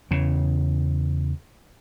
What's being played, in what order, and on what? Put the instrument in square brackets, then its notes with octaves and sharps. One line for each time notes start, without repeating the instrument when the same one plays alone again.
[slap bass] E2 C#3